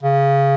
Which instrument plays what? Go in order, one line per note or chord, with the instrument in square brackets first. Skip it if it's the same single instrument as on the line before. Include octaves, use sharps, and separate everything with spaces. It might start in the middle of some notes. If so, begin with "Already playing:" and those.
[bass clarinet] C#3